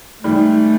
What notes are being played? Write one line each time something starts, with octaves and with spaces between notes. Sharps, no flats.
G#2 D#3 G3 A3